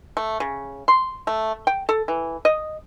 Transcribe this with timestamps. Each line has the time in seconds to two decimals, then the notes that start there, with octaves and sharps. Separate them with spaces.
0.17 A3
0.40 C#3
0.88 C6
1.27 A3
1.67 G5
1.89 A4
2.08 E3
2.45 D#5